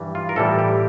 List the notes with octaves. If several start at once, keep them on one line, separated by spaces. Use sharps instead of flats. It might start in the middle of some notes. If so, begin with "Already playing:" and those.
Already playing: G2 E3 G3
F4
A#4
A2 E3 G3 A4
G4